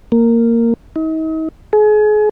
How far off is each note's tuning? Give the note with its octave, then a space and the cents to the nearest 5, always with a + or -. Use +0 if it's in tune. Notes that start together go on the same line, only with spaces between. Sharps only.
A#3 -10
D#4 +40
G#4 +35